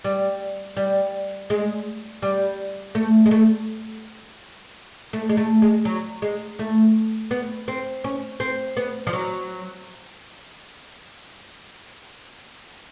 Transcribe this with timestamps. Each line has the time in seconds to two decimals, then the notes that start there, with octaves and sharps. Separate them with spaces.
0.05 G3
0.77 G3
1.50 G#3
2.22 G3
2.95 A3
3.26 G#3
3.31 A3
5.13 A3
5.29 G#3
5.37 A3
5.62 G#3
5.85 F#3
6.22 G#3
6.59 A3
7.31 B3
7.68 C4
8.04 C#4
8.40 C4
8.77 B3
9.07 F3
9.13 F#3